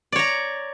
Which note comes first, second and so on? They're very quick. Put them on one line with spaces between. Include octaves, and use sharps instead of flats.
D5 C#5 A#5